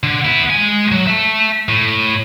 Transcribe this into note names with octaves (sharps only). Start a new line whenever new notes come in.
D3
B3 E4
G#3 G#5
F#3
E5 A5
A2